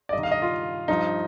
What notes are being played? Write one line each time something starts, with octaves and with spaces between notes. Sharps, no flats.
D5
G2 D#5
D#3 F5
D#5
F4
G2 F3 D#4